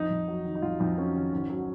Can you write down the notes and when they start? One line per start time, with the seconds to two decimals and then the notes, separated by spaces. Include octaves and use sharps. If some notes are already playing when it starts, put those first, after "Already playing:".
Already playing: F2 D#4
0.10 F2
0.28 F#3
0.45 D#3
0.55 D#4
0.62 F2 F4
0.80 F2 D#4
0.98 F#3 C#4
1.15 D#3 C#4
1.32 G#1
1.50 F#3